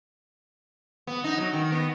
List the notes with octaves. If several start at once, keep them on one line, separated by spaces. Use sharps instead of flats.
B3
D#4
F#3
D#3
B3